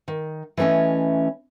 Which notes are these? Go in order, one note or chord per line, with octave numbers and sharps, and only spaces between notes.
D#3
E3 A3 A#3 C#4 D#5